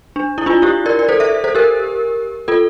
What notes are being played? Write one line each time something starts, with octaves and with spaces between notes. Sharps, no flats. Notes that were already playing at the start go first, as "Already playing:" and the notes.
D4
E4
D4 F4
E4 G4
A#4 D5
D5
A4 C5
C5 E5
A4 C5
G4 A#4
F4 A4